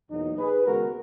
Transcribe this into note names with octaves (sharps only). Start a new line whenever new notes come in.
E2 B2 F#3 A#3 D#4
G#4 B4
D#2 C#3 G#3 B3 F#4 A#4